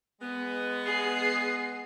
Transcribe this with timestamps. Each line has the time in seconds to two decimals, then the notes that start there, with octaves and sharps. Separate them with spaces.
0.21 G#3 B3
0.86 G#4 C7